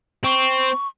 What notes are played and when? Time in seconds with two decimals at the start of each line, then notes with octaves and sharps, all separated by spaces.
0.24 C4 C#6